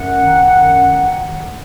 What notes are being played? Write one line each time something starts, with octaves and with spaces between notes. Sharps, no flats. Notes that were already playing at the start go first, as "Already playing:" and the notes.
Already playing: F#2 F#5
D#3
F#2
D#3